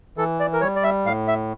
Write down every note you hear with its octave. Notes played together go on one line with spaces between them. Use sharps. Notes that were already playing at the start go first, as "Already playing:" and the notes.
E3 A4
D5
A#4
G3 C#5
D5
E5
A2 F5
E5